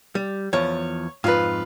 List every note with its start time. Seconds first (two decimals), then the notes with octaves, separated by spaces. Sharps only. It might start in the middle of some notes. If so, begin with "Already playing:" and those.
0.15 G3
0.53 E2 F3 C#5
1.24 F2 G#2 F4 B4